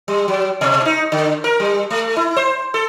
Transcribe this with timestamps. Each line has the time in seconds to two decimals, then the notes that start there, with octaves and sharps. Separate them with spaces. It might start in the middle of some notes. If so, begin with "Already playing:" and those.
0.08 G3
0.28 F#3
0.61 B2
0.85 D#4
1.12 D3
1.44 A#4
1.60 G3
1.90 A3
2.16 E4
2.36 C5
2.74 A4